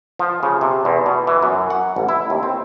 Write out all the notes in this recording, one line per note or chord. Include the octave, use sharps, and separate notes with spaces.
F3
C#3
C3
E2
B2
E3
F#2
F#5
A1
E4
D#2
C4